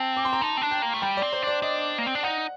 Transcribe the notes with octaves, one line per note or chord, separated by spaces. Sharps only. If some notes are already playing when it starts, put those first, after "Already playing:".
Already playing: C4 A5
D6
C6
A#5
D#4 A5
C4
D4
G5
A#3
A3
G3 G5
C4 D5
C5
D4 D5
D4 D#5
A#3
C4
D4
D#4 F#5